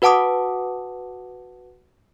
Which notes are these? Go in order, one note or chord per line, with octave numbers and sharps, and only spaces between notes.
F#4 B4 F#5 A5 D6 D#6